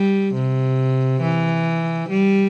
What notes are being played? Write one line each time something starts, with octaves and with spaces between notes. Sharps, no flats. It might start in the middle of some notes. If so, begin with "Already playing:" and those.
Already playing: G3
C3
E3
G3